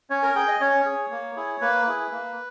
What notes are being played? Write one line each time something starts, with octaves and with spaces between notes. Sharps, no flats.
C#4 C#5
A#4
G#4 G5
D#5
C#4 C#5
G#4
A#3
E4 G#4
A#3 B4
E4 G#4
A#3